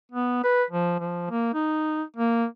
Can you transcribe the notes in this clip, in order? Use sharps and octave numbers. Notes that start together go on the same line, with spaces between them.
B3
B4
F3
F3
A#3
D#4
A#3